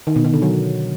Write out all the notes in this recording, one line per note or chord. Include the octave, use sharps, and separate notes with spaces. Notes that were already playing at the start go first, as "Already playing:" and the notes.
D#3
B2
D#3
D3
F#3